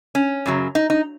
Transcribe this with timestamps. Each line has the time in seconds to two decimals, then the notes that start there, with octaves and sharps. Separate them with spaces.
0.15 C#4
0.46 F#2 C#3 F#3
0.75 D#4
0.90 D#4